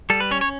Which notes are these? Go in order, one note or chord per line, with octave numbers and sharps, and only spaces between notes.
G3 A4
B4
C#4 C#5
C#5